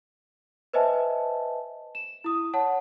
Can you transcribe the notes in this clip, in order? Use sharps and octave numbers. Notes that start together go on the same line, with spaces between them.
B4 C5 D#5 E5 G#5 A5
E7
E4 D#6
C#5 F#5 A5